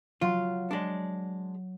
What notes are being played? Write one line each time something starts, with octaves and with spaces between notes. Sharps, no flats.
F#3 F4
G#3 D4